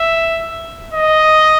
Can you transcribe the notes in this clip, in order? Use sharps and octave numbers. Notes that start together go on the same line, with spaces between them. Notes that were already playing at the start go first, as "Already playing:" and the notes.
Already playing: E5
D#5